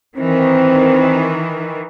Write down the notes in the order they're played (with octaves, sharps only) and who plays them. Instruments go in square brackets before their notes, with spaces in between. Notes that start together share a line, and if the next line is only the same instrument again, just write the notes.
[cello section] D#3 E3 [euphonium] C4